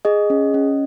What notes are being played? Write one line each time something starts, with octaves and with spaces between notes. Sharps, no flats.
G#4 D#5
C#4
C#4